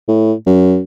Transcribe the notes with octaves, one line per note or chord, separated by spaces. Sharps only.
A2
F#2